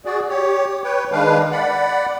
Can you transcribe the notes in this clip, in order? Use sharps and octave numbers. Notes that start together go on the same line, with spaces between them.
F#4 G#4 D5
G4 C#5
B4 C#5 G5
D#3 G#3 D4 B4 F5
D5 F#5 B5